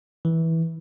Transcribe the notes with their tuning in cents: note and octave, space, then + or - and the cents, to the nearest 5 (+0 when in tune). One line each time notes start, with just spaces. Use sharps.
E3 -15